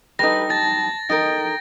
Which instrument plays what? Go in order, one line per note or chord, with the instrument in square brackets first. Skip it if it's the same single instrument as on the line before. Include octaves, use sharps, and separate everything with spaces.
[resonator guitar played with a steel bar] G3 D#4 [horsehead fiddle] A4 B4 [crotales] A#6
[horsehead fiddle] A5 [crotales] A6
[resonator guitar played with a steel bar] D#4 A4 A#4 [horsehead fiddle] G5 [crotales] A#6